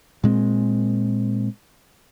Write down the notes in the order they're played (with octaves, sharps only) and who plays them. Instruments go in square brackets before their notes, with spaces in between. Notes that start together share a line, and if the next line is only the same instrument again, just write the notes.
[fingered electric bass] A#2 G#3 C4